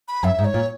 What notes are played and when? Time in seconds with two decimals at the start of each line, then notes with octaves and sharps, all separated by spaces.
0.08 B5
0.23 F#2 E5
0.39 G#2
0.45 C#5
0.54 A#2